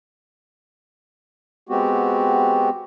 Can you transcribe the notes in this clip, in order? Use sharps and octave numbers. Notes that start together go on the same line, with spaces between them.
G#3 B3 C4 F#4 G4